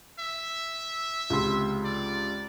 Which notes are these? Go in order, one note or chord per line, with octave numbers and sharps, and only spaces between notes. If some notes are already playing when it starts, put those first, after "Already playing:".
E5
C#2 C3 C6
D5